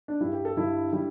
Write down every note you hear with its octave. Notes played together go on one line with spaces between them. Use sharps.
D4
G2 G3 E4
G4
A4
G2 D3 G3 E4
D3 G3 E4